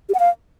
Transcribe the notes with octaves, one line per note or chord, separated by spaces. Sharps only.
G4
F#5
F5